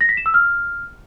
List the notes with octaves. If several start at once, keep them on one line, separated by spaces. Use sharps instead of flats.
A#6
B6
E7
E6
F6